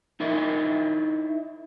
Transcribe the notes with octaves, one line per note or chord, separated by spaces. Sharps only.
D#4 E4 A#4 C#5 D#5 E5